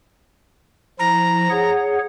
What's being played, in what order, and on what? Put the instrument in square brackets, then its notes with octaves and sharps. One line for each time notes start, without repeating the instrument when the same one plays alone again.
[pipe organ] F3 E4 [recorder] A#5
[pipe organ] G#4 C#5 F#5